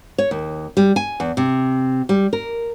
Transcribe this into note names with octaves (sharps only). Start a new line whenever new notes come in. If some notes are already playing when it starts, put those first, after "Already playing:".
C#5
D#2
G3
G#5
E2
C3
G3
A#4